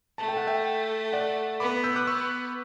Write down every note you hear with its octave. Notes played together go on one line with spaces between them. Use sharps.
A3 A5
G5
F#5
E5 G5
D5 F#5
B3 B5 D6
E6 G6
D6 F#6
B3 C#6 E6